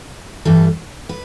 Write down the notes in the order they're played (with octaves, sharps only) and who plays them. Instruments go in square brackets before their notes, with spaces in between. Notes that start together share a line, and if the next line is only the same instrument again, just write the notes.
[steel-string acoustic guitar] G2 E3 G3 A4
B4